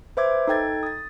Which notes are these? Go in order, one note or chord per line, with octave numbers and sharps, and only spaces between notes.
B4 C5 E5 D6 G#6
D#4 A4 G5 G#6 A6
D#6 A6